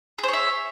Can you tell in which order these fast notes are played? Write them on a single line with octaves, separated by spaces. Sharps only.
G#4 C5 C#5 E5